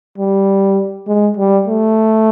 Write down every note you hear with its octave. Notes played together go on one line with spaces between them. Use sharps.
G3
G#3
G3
A3